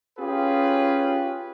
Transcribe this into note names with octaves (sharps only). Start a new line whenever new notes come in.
C#4 F4 G4 G#4 B4